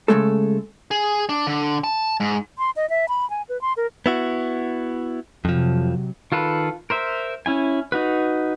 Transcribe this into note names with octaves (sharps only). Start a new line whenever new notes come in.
C#3 E3 G#3 A3 A4
G#4
D4
D3
A5
G#2
C6
D#5
E5
B5
G#5
B4
C6
A#4
B3 E4 F#4
F2 C3 F3 F#3
D#3 F4 A4 B4
A#4 C5 E5
C#4 E4 G#5
D#4 F#4 B4